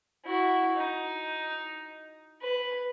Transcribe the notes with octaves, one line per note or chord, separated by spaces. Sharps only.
E4 F#4
D#4
B4